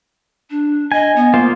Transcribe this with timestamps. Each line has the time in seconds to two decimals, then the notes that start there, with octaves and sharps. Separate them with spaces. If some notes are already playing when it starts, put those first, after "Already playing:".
0.50 D4
0.92 D#5 G#5
1.16 B3
1.34 A#3 F4 C5